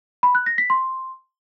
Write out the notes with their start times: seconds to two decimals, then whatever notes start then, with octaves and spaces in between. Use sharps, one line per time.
0.23 B5
0.35 F#6
0.46 A#6
0.58 B6
0.70 C6